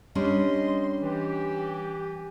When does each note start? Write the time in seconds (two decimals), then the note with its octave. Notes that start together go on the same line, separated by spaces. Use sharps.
0.15 G3 C#4 D4 D#5 C6
1.01 E3 G4